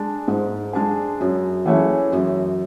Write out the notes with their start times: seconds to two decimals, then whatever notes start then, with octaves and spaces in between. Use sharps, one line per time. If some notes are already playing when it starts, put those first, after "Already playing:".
Already playing: G#3 D4 G#4
0.28 G#2
0.73 G#3 D4 G#4
1.20 F#2
1.66 E3 A3 C#4 G#4
2.13 F#2